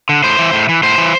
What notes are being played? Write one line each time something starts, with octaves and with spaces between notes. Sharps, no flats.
D3
A2 C5
E3
A2
E3
A2 C5
E3